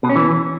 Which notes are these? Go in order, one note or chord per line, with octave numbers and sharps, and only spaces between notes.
B2
C#4
E3